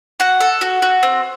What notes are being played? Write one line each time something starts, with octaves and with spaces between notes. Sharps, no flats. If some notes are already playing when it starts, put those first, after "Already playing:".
F#4 F#5
A4
F#4
F#4
C4